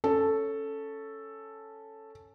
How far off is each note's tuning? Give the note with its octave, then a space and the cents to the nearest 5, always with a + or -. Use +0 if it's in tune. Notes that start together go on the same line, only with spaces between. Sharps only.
C#4 +0 A4 +0